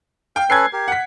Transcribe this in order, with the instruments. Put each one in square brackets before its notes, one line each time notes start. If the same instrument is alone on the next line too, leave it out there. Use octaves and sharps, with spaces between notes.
[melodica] F5 [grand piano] G5
[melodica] C#4 A4 B4 [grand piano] G#6 C7
[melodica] G4 A#4
[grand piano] F#5 B6